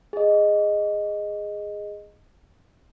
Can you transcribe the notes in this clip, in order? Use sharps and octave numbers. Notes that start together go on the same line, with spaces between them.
G#4 D#5